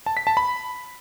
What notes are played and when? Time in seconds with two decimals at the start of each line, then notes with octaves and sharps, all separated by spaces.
0.06 A5
0.17 B6
0.27 A5
0.37 B5